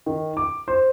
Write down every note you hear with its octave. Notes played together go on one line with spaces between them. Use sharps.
D#3
D6
C5